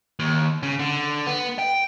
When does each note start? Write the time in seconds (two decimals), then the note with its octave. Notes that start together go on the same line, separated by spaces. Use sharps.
0.19 D#2
0.63 C#3
0.79 D3
1.26 B3
1.59 G5